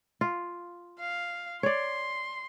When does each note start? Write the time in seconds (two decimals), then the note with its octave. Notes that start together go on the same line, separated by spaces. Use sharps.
0.21 F4
1.00 F5
1.63 C#5 D5 C6